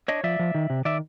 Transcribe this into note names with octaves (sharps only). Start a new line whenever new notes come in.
D4 C#5 D#5
F3 D5 E5
F3
D#3
C3
D#3 D5 E5